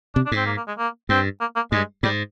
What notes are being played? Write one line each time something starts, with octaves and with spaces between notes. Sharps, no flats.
C3 D4
D4
G#2
C4
A#3
A#3
G#3
A#3
G2 C4
A#3
A#3
G2 G#3
G#2 G3